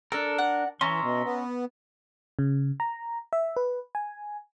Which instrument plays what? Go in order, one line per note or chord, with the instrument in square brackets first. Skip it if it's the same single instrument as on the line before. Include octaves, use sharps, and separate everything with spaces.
[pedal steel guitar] D4 A#4 [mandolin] A4
[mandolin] F#5
[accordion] E3 [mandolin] C#4 [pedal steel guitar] E5 A#5 C6
[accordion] B2
B3
[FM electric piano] C#3
A#5
E5
B4
G#5